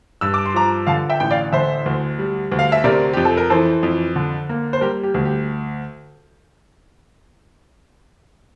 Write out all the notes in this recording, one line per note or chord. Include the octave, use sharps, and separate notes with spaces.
G2 E6
D6
C6
F3 A#5 D6
D3 F5 A5
E5 G5
A1 G5
D5 F5
D3 C5 E5
D2
G3
D2
F5
E5
C3 A#4 D5
F2 G4
A4
A#4
E3 A4 C5
F2
D3
A#3
C5
G3 G4 A#4
G4
D2
G4